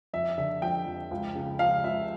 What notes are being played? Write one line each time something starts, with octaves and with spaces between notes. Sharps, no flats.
F2 E5
D3 E5
F3 G5
F2
C#2
C#3
F3 F5
C#2 E5